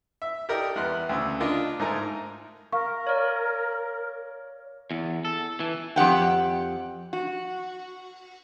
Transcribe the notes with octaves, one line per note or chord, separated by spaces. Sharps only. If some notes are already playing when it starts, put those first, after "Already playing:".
E5
G4 A4 A#4 D5 D#5 G5
E2 B3 C6 F#6
D2 C#3 E6
D4 F4 A#4 D#5
G#2 A3 D#4 A#4 G#5 A#5
A#4 F5 C#6
C#5 D5
E2
A4
E3
F2 G4 F#5 G5
F#4